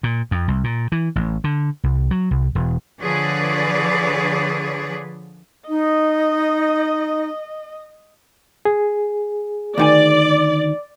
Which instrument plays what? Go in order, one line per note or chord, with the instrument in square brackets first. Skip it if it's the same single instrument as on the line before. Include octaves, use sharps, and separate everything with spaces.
[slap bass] A#2
F2
C2
A#2
E3
A1
D3
C2
F#3
C2
E1
[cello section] D3 F3 G#4 B4 C#5 D5
[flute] D#4 [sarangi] D#5
[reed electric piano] G#4
[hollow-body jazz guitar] D2 D#3 G#5 [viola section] D5